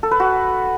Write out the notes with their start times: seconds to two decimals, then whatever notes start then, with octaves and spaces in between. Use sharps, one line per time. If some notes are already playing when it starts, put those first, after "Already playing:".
0.03 A4
0.11 B4
0.20 F#4